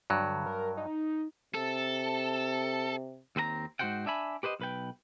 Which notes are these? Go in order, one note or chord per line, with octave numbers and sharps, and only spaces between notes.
G2 D3 F#3
A#4
D#4
C3 A4
D#2 C4 B4 A#5
G#2 E3 F#4 C5 F#5 G5
D4 E5 G#5 B5
G4 B4 C5 D#5
B1 B4 G5